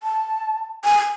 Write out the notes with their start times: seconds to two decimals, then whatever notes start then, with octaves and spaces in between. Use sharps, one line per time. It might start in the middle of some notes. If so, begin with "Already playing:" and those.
0.03 A5
0.85 G#5